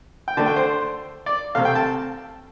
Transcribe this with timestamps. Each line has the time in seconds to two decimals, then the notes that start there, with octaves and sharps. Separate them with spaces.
0.28 G5
0.37 D3 A3 A5
0.46 G5
0.56 C5
1.26 D5
1.55 C3 A3 F5
1.65 G5
1.75 A5